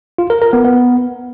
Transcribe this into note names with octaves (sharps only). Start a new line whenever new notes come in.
F4
A#4
A#4
B3
B3